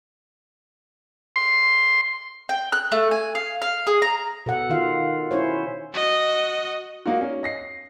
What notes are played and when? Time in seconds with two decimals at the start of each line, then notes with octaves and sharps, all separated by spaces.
1.36 C6
2.49 G5
2.72 F#6
2.92 A3
3.11 G#5
3.35 F5
3.62 F5
3.87 G#4
4.02 A#5
4.46 B2 A4 F#5
4.70 D#3 F4 F5
5.31 C#4 E4 C5 C#5
5.93 F#4 D#5
7.06 A#3 D#4 F4 F#4
7.21 C#4
7.43 D#5 A#6 C7